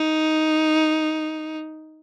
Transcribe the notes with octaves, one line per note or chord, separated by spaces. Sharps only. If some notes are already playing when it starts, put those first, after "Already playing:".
Already playing: D#4